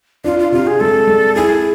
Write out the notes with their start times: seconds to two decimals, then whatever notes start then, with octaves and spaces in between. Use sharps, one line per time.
0.24 D4 F4
0.39 F4
0.52 C3 F4
0.67 G#4
0.80 G#3 A4
1.07 G#3
1.35 E4 G#4